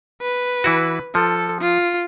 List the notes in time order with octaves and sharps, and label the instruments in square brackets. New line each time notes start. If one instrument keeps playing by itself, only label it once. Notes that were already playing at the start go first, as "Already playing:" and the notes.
[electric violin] B4
[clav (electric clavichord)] E3 E4 F#4
[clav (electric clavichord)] F3 [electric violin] A4
[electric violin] F4